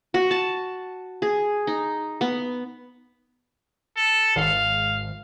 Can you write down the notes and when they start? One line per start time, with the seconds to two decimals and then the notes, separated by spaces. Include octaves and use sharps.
0.14 F#4
0.31 A5
1.22 G#4
1.67 D#4
2.21 B3
3.96 A4
4.36 G#1 F5